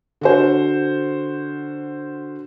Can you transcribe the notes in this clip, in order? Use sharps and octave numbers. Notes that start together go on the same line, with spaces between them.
D3 F#4 C5